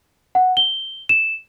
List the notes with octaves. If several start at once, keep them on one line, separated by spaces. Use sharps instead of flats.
F#5
G7
E7